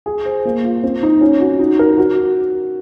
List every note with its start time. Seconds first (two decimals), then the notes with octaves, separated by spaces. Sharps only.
0.06 G#4
0.26 C5
0.45 A#3
0.64 F4
0.84 C4
1.03 D#4
1.21 C#4
1.41 F#4
1.60 D#4
1.79 A#4
1.98 F#4